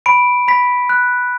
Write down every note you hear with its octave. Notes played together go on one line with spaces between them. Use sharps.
B5 D7
B5 B6
F#6